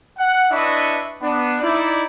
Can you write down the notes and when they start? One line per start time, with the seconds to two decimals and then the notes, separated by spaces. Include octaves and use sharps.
0.18 F#5
0.52 D4 E4 B4 D#5 E5 C#6
1.22 B3 D4
1.61 D#4 E4 D5